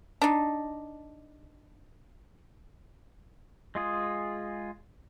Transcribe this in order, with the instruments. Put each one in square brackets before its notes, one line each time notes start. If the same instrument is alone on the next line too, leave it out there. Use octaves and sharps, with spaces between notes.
[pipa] D4 D#4
[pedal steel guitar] G#3 F4 G#4